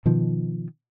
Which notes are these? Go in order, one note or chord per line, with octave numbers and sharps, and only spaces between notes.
B2 D#3 F3